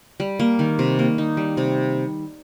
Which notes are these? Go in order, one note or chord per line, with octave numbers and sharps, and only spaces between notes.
G3
A#3
D#3
C3
A#3
D#4
G3
C3